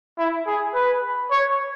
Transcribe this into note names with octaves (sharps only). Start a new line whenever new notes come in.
E4
G#4
B4
C#5